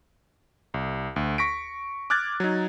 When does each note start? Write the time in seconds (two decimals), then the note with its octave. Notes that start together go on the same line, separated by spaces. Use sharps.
0.74 C2
1.16 D2
1.38 C#6 A#6 B6 D7
2.10 D6 F6 F#6 G#6 A6
2.40 F#3 D#4